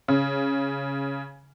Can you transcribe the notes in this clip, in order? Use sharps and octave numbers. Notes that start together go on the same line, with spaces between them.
C#3